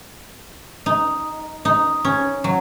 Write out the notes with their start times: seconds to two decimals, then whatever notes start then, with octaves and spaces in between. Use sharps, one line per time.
0.86 D#4
1.65 D#4
2.05 C#4
2.44 F#3